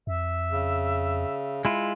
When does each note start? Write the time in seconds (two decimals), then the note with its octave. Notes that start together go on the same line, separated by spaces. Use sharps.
0.07 F2 E5
0.51 C#3
1.65 G#3 E4 F4